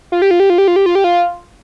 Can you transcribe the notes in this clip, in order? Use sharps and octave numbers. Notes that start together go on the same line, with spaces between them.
F4
G4
F4
G4
F4
G4
F4
G4
F4
G4
F4